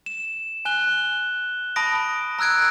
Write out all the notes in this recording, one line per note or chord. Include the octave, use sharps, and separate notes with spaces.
E7
G#5 F#6 G7
A5 B5 D#6 A#6 D7
A#5 E6 F#6 G#6 D7